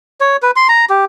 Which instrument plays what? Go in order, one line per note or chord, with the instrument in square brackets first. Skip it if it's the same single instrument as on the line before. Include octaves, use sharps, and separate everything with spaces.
[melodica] C#5
B4
C6
A#5
G4